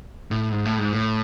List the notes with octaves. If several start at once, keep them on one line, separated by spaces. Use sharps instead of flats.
A2
G#2
A2
G#2
A2